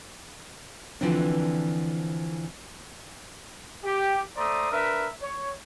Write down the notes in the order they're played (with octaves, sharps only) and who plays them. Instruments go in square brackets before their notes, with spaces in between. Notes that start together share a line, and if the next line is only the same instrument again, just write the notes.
[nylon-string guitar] D3 E3 F3 C4 D4
[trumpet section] G4
A3 C5 D5 A#5 D#6
D4 A#4 B4 E5
C#5